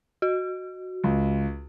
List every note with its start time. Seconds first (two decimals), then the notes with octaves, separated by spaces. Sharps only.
0.22 F#4
1.04 C#2